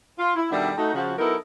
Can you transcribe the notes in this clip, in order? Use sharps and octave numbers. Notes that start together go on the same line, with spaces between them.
F4
E4
B2 D#3 G3 D4 A4 E5
A3 D#4 F#4
C#3 F3 F#4
F#3 B3 D#4 E4 A4 A#4